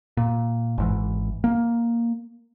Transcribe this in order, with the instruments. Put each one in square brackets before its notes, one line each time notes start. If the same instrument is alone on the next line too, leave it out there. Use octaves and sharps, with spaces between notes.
[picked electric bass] A#2
G#1 G#2 E3
A#3